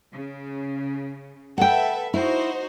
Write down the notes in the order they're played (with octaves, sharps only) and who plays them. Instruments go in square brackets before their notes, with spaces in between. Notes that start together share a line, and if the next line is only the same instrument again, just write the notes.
[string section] C#3
[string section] A4 B4 E5 [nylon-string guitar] F#5 G5
[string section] D#4 F#4 C5 [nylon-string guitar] E4